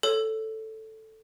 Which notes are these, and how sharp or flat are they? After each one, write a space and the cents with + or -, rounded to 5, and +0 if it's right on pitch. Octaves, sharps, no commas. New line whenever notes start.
A4 +0 C#5 +0